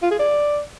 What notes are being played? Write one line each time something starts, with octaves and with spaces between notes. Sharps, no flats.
F4
G#4
D5